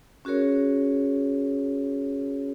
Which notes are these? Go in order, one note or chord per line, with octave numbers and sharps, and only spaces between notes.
C#4 F#4 G#4 A#4 C#5